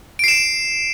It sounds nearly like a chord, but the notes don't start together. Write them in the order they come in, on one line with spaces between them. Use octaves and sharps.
D7 C7 E7